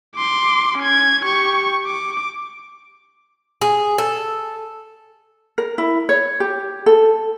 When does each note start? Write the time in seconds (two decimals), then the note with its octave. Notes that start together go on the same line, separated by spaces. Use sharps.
0.15 C6 D6
0.79 C#4 G#6
1.25 G4 C#6
1.86 D6
3.61 G#4
3.98 A4
5.58 A#4
5.78 E4
6.09 C#5
6.40 G4
6.86 A4